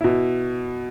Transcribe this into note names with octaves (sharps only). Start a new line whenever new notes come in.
B2 E4